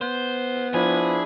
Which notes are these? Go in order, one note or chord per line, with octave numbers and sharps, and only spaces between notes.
B3 C5
F3 D4 E4 G#4 B5